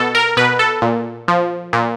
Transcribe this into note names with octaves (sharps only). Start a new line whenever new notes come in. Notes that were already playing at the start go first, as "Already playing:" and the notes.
Already playing: B2 A4
A#4
B2 B4
A4
A#2
F3
A#2